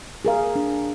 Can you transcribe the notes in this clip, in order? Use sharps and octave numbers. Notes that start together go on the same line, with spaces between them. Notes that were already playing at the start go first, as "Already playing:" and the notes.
G#4 A#4 F5
D4